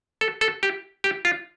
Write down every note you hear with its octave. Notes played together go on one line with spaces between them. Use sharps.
A4
A4
G4
G4
F4